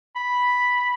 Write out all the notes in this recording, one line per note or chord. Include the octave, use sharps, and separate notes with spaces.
B5